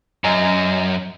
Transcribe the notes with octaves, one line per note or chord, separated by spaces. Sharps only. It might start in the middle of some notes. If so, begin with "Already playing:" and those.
F#2 D#5 G#5 A#5